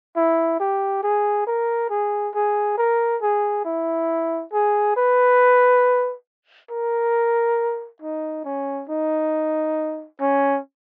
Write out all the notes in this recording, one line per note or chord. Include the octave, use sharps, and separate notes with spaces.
E4
G4
G#4
A#4
G#4
G#4
A#4
G#4
E4
G#4
B4
A#4
D#4
C#4
D#4
C#4